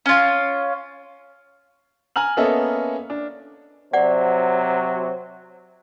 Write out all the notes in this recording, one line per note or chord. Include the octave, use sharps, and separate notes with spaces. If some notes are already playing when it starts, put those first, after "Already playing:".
C#4 F4
G#5 A#5 F6 F#7
A#3 B3 C#4 A4 D#5 E5
D4
C3 F#3 C5 D5 F#5